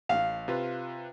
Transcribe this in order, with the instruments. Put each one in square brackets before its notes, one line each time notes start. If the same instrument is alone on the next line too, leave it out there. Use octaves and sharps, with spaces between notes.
[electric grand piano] A1 [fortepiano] F5
[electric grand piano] C3 F4 B4